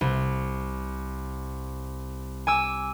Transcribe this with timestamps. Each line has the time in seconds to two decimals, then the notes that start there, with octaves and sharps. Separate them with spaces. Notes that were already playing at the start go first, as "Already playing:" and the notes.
0.01 C2
2.47 G#5 D6 E6